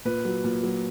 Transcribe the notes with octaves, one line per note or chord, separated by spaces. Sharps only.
A#2 B4
F#3
A#2
F#3